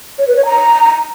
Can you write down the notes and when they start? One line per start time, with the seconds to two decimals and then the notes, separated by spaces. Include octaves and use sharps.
0.19 C#5
0.28 B4
0.36 C#5
0.45 A#5